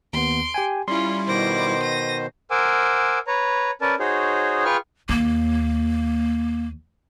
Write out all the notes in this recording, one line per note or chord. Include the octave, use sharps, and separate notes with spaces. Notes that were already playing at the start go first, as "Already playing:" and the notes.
D#2 B3 C6 D7
G4 G5 G#5
G3 C#4 E4 F4 C6
B2 D#3 C5 D6 A#6
A#6 D#7
A#4 C5 F#5 G#5 D6 E6
B4 C#5 A#5
C#4 A#4 B4 D5 A5
D#4 F#4 G#4 C5 C#5
F4 G#4 B4 G5 C#6 F6
D#2 A#3